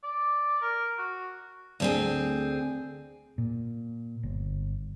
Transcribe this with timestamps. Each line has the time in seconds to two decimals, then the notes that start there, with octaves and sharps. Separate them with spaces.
0.04 D5
0.62 A#4
0.98 F#4
1.80 D2 C4 G#4
3.38 A#2
4.23 G1